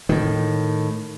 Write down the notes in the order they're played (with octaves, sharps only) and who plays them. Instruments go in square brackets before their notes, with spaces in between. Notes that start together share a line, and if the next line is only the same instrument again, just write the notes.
[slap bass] A2 D#3